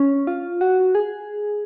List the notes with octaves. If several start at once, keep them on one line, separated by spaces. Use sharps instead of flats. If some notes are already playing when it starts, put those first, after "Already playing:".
Already playing: C#4
F4
F#4
G#4